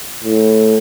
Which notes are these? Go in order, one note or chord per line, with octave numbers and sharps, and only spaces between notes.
A2